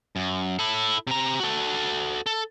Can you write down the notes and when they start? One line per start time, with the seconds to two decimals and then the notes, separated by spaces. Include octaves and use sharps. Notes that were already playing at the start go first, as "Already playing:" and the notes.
0.16 F#2
0.59 E4 A4
1.07 C3 A#5
1.40 F#4 A4
2.26 A4